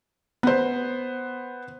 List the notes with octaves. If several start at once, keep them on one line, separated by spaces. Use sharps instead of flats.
B3 C5